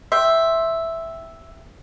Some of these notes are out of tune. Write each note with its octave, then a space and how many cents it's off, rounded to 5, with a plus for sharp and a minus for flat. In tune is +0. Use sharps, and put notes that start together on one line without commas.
E5 +0 G5 +0 C6 +15